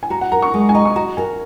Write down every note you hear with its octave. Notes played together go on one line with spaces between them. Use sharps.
G#5
F#4 A#5
F#5
A#4 A#5
C#6
G#3
G#5
D#5 A#5
C#6
F#4 A#5
A#4 G#5